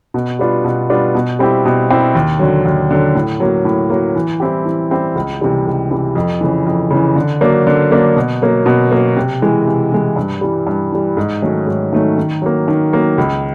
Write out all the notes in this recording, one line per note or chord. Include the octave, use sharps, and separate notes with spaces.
B2
G3 B3 D4 F4
B2
G3 B3 D4 F4
B2
G3 C4 E4 G4
B2
G3 C4 E4 G4
D#2
D3 F#3
D#2
D3 F#3
A2
F#3 A#3
A2
F#3 A#3
E3
G3 C4 E4 G4
E3
G3 C4 E4 G4
C#2
C3 E3 G3
C#2
C3 E3 G3
F2
C#3 E3
F2
C#3 E3
D3
F#3 A#3 D4
D3
F#3 A#3 D4
B2
F#3 A#3
B2
F#3 A#3
C3
E3 G#3
C3
E3 G#3
G2
E3 G3
G2
E3 G3
G#2
D#3 F#3 A3 C#4
G#2
D#3 F#3 A3 C#4
D#3
F#3 A#3
D#3
F#3 A#3
C#2